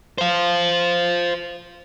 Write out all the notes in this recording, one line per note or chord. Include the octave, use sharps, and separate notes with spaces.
C5 F5